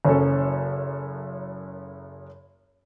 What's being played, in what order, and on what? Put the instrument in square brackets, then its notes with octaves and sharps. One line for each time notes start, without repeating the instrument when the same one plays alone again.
[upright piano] F#1 F#2 C#4 A4